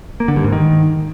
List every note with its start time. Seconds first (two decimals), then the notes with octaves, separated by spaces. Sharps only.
0.20 A#3
0.28 D3
0.36 G2
0.44 G#2
0.52 D#3